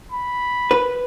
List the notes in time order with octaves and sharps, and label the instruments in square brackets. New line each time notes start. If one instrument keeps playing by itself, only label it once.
[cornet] B5
[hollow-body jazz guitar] B4